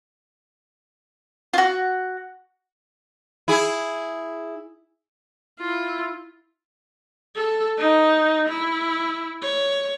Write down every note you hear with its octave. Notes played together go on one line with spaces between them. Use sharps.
F4 F#4
E4 G#4
E4 F4
A4
D#4
E4
C#5